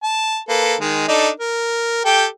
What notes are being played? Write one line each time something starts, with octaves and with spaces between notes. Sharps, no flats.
A5
A#3 A4 B4
D#3 G#3
D4 D#4 A4
A#4
G4 A4 G5